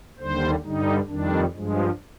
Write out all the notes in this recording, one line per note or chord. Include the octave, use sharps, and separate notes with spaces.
D#2 D3 G3 C5
G2 D3 G3 D#4
F2 D#3 G3 D4
G2 F3 G#3